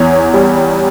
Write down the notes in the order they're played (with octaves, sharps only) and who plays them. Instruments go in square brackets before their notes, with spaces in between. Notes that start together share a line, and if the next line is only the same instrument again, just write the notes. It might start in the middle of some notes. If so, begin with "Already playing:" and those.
Already playing: [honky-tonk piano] E2 C#5
G3